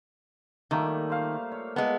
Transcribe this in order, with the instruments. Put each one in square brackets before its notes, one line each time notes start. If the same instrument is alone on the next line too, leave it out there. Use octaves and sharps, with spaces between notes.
[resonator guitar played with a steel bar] D#3 [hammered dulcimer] G3 A3 A#3
[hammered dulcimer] C5 F5
C#5
[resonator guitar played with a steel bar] G#3 B3 [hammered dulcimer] A4